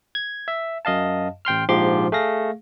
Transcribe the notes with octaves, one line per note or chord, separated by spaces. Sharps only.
G#6
E5
F#2 D#5 F5 A5
A1 G5 C6 F6
A#1 G#2 F3 G4 C6 D6
A3 G#4 F5 A#6